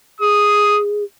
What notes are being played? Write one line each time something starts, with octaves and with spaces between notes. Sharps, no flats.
G#4 D#6